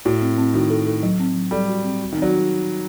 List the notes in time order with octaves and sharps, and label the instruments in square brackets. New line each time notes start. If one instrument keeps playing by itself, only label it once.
[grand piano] A2 [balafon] F#4
[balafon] C4
C4
[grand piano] D#3 [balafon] F#4
[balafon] A4
A4
F#3
C4
F#3
[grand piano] G3 [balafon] A4
[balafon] F#4
C4
F#4
[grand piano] D#3
[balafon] C4
[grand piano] F#3